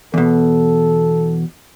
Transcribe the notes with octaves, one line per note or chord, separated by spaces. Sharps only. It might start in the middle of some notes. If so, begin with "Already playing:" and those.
E2 B2 A4